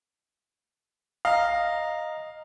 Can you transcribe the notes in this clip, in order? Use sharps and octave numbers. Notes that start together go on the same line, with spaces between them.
D#5 F5 A#5